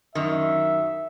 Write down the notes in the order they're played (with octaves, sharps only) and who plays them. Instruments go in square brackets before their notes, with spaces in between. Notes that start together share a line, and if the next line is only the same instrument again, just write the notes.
[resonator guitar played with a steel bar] F#2 D#3 [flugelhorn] E5